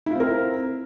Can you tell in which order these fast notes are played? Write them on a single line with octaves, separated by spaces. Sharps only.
E4 F4 C4 A#4